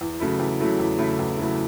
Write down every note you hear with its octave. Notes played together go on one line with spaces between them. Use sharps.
E2
C#3 F#3 A3 E4
E2
C#3 F#3 A3 E4
E2
C#3 F#3 A3 E4
E2
C#3 F#3 A3 E4